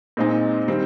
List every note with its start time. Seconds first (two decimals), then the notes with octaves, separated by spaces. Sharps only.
0.17 A#2 G#3 C4 D#4
0.68 D#3 G3 C4